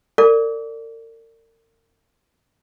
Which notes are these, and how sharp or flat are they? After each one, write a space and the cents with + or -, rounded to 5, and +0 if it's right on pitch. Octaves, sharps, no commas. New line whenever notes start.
A#4 -40 D5 +0 D6 -35